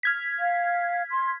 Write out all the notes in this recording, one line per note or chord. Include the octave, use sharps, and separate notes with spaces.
F6 G#6 B6
F5
C6